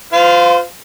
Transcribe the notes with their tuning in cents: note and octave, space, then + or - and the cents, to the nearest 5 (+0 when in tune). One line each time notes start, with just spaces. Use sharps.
F4 +0 C5 -35 F5 +0